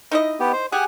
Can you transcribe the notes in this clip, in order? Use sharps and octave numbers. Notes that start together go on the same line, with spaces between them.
D#4 E4 D#5
B3 G4
C5
G4 G#4 F#5 G#5